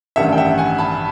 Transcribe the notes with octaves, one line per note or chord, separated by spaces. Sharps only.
A1 G2 D#3 G3 E5 F#5
G5
E5 F#5
F#5 G#5
A5 B5